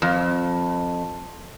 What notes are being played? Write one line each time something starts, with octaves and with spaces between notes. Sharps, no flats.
F2